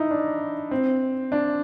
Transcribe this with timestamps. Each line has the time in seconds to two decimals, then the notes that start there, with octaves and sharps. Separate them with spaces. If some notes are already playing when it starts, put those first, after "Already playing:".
Already playing: D#4 E4
0.11 D4
0.71 C4
1.32 D4